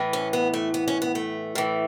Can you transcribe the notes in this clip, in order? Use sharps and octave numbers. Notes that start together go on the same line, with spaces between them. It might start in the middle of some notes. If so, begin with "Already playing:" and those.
Already playing: A2 E3
C#4
B3
A3
B3
C#4
B3
A3
A2 E3